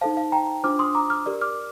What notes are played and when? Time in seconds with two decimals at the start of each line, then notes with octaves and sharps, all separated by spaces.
0.01 D#4 A4 C5 F5 A5
0.17 F5
0.32 G5 A#5
0.63 D4 F4 C5 D6 F6
0.79 C6 D#6
0.95 A#5 D6
1.10 D6 F6
1.26 G4 A#4 D5
1.41 D6 F6